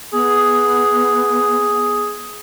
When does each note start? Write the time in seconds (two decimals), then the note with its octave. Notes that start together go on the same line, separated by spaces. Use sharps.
0.13 B3 G#4